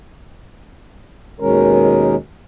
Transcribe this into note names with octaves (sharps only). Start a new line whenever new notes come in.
D#2 B2 D#3 G#3 C#4 A#4